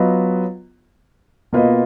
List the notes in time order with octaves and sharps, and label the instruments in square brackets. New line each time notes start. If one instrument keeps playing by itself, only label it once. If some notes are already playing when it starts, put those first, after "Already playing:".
Already playing: [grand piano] F#3 B3 F4 B4 D#5
B2 A#3 F4 B4 D#5